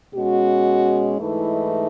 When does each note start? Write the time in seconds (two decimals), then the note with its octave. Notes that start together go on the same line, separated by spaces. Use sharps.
0.13 B2 G#3 C#4 F#4
1.16 G#2 E3 A3 D#4 E4